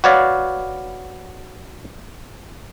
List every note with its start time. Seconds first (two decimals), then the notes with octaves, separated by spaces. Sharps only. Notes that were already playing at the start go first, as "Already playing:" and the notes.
0.04 F#4 B4 C#5 D5 F5